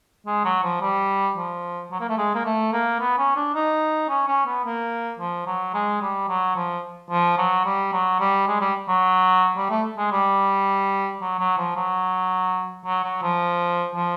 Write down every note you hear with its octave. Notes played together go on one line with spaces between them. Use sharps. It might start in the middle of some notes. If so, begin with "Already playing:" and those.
G#3
F#3
F3
G3
F3
F#3
A#3
A3
G#3
A#3
A3
A#3
B3
C#4
D4
D#4
C#4
C#4
B3
A#3
F3
F#3
G#3
G3
F#3
F3
F3
F#3
G3
F#3
G3
G#3
G3
F#3
G3
A3
G#3
G3
F#3
F#3
F3
F#3
F#3
F#3
F3
F3